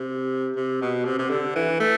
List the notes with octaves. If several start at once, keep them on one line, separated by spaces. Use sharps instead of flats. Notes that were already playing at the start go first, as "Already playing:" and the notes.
Already playing: C3
C3
B2
C3
C3
D3
E3
A3